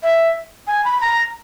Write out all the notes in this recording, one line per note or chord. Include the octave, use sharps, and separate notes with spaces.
E5
G#5
B5
A#5